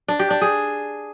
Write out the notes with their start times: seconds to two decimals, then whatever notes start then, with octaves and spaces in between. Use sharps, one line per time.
0.08 D4
0.19 G4
0.30 D4
0.41 G#4